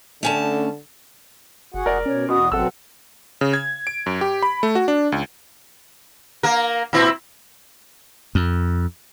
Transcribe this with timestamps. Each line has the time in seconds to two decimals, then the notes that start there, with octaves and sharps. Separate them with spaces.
0.23 D3 A3 C#4 A5
1.74 F#1 F#4 G#4 F#5
1.86 F1 A#4 D5
2.06 B2 C#4 C#5
2.29 E2 B2 F#4 D#6
2.52 G#1 B2 F#3 C4 A4 F#5 E6
3.41 C#3
3.53 G#6
3.87 D7
4.06 F#2
4.21 G4
4.43 B5
4.63 A3
4.75 F#4
4.88 D4
5.12 C#2
6.43 A#3 A#4
6.93 A#2 C4 E4
8.35 F2